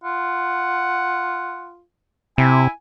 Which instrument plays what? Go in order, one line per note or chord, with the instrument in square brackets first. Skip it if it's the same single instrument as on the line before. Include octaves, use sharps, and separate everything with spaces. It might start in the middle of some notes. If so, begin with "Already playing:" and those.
[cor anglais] F4 [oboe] F#5
[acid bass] C3 [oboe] E4 [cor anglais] G#5